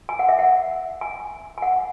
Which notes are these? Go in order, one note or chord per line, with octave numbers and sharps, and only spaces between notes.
G#5
F#5
E5
F#5
G#5
G#5
F#5